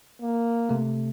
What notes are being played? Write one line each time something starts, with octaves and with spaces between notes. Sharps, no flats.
A#3
C3 A3